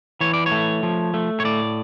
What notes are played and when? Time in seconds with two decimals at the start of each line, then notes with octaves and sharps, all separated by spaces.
0.21 E3 C#5
0.34 D5
0.46 C#5
0.51 A3
0.83 F3
1.14 A3
1.40 C#5
1.45 A2 D5